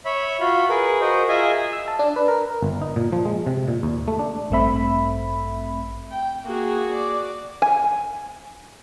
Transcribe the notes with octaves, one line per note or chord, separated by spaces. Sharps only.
C#5 E5 B5
F4 F#4 B5
G#4 A#4 B4
F#4 A#4 C5 D#5
F4 G#4 D#5 E5 G#5
E6
A5
D4
B4
A#4
G1
D#4
A#2
F3
G#3
C3
A#2
D#2
A3
D4
A1 G2 A3 C4 E5 B5
G5
A#3 F#4 G#4
D5
G#5